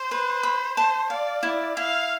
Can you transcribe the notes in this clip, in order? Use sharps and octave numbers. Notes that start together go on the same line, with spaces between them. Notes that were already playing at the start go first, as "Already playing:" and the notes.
Already playing: C5
B4
B5
C5 A5
D5 F5
E4 D5
E4 F5